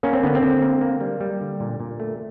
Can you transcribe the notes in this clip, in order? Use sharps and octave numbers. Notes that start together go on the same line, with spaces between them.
A#3 C#4
C4
D3 B3
C4
D3
A#3
A#3
G3
G3
D3
A#2
A#2
A3